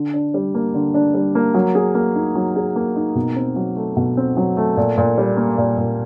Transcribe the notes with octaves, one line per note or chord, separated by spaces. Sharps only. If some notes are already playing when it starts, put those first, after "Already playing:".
Already playing: D3
D4
G3
A#3
D3
D4
G3
A#3
F#3
G#4
A#3
D#4
F#3
G#4
A#3
D#4
B2
C4
F#3
A3
B2
C4
F#3
A3
A#2
A#2
G3
A#3
A#2
A#2